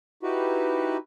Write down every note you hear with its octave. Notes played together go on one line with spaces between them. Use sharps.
D#4 E4 F#4 G4 B4